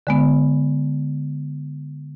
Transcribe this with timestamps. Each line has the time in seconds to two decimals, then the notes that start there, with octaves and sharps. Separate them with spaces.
0.07 D3 G#3 B3